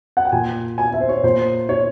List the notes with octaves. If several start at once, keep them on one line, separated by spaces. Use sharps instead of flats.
F#5
G5
A#2 G#5
G#5
E5
C5
C#5
A#2 C5
C#5